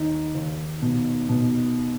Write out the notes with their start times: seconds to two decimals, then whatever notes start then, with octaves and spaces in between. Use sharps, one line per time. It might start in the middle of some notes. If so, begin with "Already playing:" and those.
Already playing: D#2 D#4
0.35 D#2
0.82 B2
1.29 B2